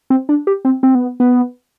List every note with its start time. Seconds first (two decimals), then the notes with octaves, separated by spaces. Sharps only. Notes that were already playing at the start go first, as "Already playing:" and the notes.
0.10 C4
0.29 D4
0.47 G4
0.65 C4
0.83 C4
0.95 B3
1.20 B3